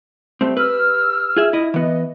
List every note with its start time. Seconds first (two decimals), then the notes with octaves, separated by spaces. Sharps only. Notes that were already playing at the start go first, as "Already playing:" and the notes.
0.41 G3 A3 C4
0.57 G4 B4 E6 F6
1.37 F4 G#4 E5
1.53 E4 D#5
1.74 E3 B3 D#5